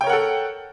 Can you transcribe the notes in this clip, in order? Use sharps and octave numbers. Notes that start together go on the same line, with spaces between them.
A4 A#4 C#5 F#5 G5